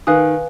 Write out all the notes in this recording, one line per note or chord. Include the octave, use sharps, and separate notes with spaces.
D#3 B4 F5 G#5 D#6 F#6